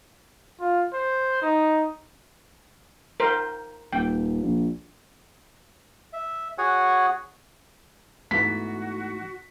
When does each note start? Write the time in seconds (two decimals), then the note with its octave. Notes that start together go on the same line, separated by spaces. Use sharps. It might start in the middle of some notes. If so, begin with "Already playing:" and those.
0.60 F4
0.93 C5
1.42 D#4
3.20 A#4 C5
3.93 D#1 G5
4.42 A#1
6.13 E5
6.58 F#4 G#4 C#5 F#5 G#5
8.31 G#2 E3 A3 B3 F#4 B6